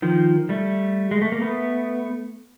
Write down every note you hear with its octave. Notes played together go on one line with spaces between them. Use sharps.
D#3 F3
G3 A3
G#3
A3
A#3
A3 B3